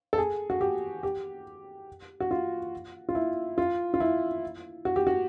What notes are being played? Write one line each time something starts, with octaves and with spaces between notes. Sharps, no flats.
A4
G#4
F#4
G4
G4
F#4
F4
F4
E4
F4
F4
E4
F#4
G4
F#4